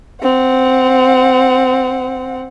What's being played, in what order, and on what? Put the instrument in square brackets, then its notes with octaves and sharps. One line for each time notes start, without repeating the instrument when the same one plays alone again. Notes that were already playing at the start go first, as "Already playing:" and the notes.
[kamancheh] C4 F#5